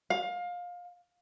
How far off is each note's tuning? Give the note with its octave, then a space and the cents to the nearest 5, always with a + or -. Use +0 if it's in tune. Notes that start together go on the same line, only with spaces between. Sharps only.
F5 +25